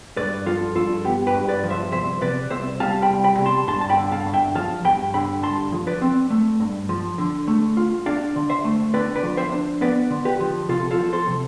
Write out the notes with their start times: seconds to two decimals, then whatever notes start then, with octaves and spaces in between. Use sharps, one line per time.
0.17 G2 B4 D5
0.46 F3 F4 A4
0.75 G2 F4 A4
1.05 B3 G4
1.27 G4 B4
1.34 G2
1.48 B4 D5
1.64 F3
1.70 C5 E5
1.92 C2 C5 E5
2.21 C3 B4 D5
2.50 C2 C5 E5
2.80 G3 F5 A5
3.02 G5 B5
3.09 C2
3.24 G5 B5
3.39 C3
3.46 A5 C6
3.68 G2 A5 C6
3.81 A5
3.90 G5 B5
3.97 D3
4.12 F5 A5
4.26 G2
4.34 E5 G5
4.55 F3 F5 A5
4.84 G2 G5 B5
5.14 D3 G5 B5
5.43 G2 A5 C6
5.72 F3
5.87 B4 D5
6.01 C4
6.30 A3
6.60 G2
6.89 F3
7.18 D3
7.48 A3
7.77 F4
8.06 D4 D5 F5
8.36 D3
8.50 C5 E5
8.64 A3
8.94 D3 B4 D5
9.16 B4 D5
9.23 F3
9.37 C5 E5
9.52 D4
9.81 B3 B4 D5
10.11 D3
10.25 G4 B4
10.40 F3
10.69 C3 F4 A4
10.91 F4 A4
10.98 F3
11.13 A4 C5
11.28 C3